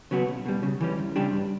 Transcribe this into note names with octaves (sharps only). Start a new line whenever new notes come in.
C#3 F#3 B3 F#4
B1
B2 G3
C#3
E3 G3 C#4
E2
C#3 G3 D4 G4
G2